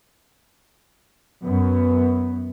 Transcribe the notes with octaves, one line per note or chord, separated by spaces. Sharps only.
F#2 B3